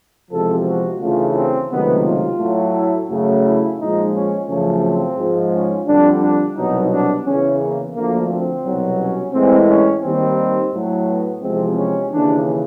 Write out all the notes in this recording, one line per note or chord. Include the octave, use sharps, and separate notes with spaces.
E2 C3 F3 G#3 A4
F#4
D2 C#3 E3 A3 F4
C4
C#2 C3 D#3 F#3 A3 B3
F4
A2 F#3 A3
E4
F#2 C#3 F#3 A3
E4
A#2 F3 G#3 D#4
C#4
F#2 C#3 F3 A3 C#4
C4
G#2 F3 G#3
C#4
F2 D3 G3 D4
D4
C2 B2 F#3 D#4
D4
E2 C#3 E3 C#4
A#3
D2 D3 F3 A3 A#3
C4
C2 B2 F#3
C#4
A2 E3 G#3 C4
C#4
D#2 D#3 G3 C4
A2 F#3 A3
B3
E2 C3 F3 G#3 C4
C#4
D#2 C#3 E3 D4